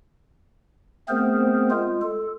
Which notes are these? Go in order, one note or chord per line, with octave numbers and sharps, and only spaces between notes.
A3 B3 C4 G#4 A#4 C5
G#3 F4
A4